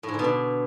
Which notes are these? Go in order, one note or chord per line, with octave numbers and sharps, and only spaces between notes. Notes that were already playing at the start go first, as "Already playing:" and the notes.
A2
G#2
D3
B2
D3